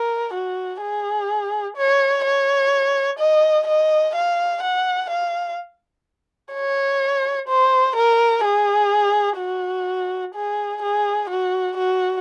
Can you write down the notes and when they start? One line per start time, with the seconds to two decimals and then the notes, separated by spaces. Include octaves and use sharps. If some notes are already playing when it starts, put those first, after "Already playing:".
Already playing: A#4
0.33 F#4
0.81 G#4
1.77 C#5
2.24 C#5
3.19 D#5
3.67 D#5
4.15 F5
4.63 F#5
5.09 F5
6.53 C#5
7.48 C5
7.95 A#4
8.44 G#4
9.39 F#4
10.34 G#4
10.82 G#4
11.30 F#4
11.77 F#4